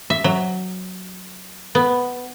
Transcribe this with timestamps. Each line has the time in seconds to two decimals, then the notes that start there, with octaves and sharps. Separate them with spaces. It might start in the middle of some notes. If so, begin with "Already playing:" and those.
0.10 E5
0.24 F#3
1.75 B3